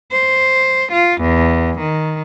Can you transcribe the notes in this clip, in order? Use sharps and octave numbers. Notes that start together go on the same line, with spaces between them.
C5
F4
E2
D#3